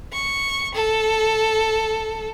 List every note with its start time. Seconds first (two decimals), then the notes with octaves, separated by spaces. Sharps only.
0.13 C#6
0.74 A4